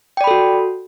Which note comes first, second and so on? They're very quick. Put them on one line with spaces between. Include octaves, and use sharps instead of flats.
G5 D5 B5 A4 F#4